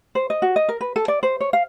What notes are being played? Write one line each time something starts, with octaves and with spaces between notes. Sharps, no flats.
C5
D#5
F#4
D#5
A#4
B4
A4
D5
C5
C#5
F5